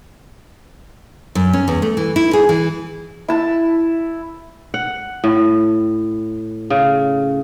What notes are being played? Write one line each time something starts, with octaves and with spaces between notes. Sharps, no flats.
F#2
C#4
E2
A3
E3
E4
G#4
E3
E4 A5
F#5
A2
C#3